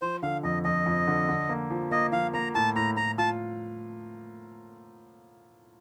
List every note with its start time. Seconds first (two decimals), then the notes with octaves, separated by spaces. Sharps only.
0.02 F3 C5
0.23 D3 F5
0.43 F2 D#5
0.64 F2 D#5
0.86 F2
1.08 D3
1.29 D3
1.49 A#3
1.70 F3
1.91 A#3 D#5
2.12 F3 F5
2.34 A#3 A#5
2.55 A2 A5
2.76 A2 A#5
2.97 A2 A#5
3.18 F4 A5